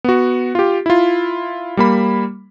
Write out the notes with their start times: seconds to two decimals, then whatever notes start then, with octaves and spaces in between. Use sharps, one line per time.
0.04 B3 F#4
0.55 F4 G4
0.86 E4 F4
1.77 G3 A#3 B5